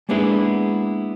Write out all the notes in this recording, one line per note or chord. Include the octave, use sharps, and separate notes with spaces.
G#3 A#3 B3 D4 E4 G#4